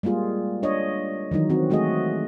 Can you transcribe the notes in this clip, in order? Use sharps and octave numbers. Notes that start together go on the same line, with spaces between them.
G3 G#3 A#3 F4 G#4
D4 C#5 D#5
D#3 E3 F#3 D#4
C4 F#4
G#3 A3 F#4 G#4 D#5